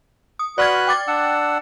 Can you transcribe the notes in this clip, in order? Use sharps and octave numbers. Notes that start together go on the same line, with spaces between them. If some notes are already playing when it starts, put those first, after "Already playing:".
D#6
F#4 B4 D5 F6 F#6 G#6
G5 D6 A6
D4 F#5 E6